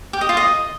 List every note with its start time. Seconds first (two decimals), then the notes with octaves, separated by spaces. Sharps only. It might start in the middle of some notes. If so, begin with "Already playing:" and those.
0.13 G4
0.21 D#5
0.29 F4
0.37 D#5